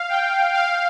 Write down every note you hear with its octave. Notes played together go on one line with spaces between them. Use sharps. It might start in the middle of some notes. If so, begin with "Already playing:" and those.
Already playing: F5
G5
F5